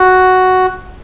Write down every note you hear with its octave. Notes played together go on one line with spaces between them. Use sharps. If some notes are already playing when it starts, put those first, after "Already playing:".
Already playing: F#4